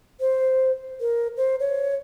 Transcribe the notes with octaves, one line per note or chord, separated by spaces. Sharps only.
C5
A#4
C5
C#5